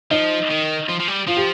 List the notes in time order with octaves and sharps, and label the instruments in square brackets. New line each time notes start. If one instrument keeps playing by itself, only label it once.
[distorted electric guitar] F3 [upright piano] D#4
[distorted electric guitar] D#3
F3
F3
G3
[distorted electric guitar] F3 [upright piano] F4
[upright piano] G4